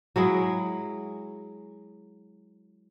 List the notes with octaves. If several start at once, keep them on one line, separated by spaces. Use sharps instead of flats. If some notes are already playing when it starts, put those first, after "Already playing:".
F#3 G#3 E4 G#4